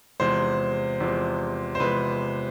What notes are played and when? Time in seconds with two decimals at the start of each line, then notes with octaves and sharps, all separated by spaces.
0.20 E2 C3 F3 G#3 C5
1.00 E2 C3 F3 G#3
1.75 C5
1.80 E2 C3 F3 G#3 B4